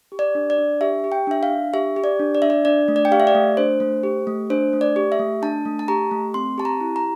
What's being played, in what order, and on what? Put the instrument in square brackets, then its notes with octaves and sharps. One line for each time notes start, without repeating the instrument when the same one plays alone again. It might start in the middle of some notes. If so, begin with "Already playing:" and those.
[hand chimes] G4
D5
D4
D5
D4
G4 E5
G4
G5
D4 E5
F5
D4
G4 E5
G4
D5
D4
D5
D4 E5
D5
D4 D5
A3
D5
G5
G4 F5
E5
D5
A3
D4 C5
A3
G4
A3
D4 C5
A3
D5
G4
E5
A3
D4 A5
A3
A5
G4 A#5
A3
C4 C6
G4 A5
A#5
E4
A#5